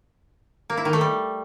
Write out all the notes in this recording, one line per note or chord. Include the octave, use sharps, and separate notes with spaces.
A#3
E4
D#3
A3
G3